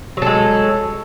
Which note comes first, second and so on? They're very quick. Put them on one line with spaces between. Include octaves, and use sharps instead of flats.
F#3 A4 G#3